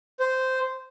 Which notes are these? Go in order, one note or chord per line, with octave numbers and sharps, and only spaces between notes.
C5